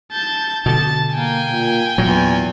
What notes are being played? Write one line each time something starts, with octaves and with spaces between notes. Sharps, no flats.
A5 G6
B2 D3 A5
A#3 G5 G#5
A#2
E2 A#2 F#3